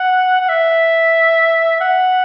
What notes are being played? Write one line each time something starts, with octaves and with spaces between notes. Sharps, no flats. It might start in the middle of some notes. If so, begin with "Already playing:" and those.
Already playing: F#5
F#5
E5
F#5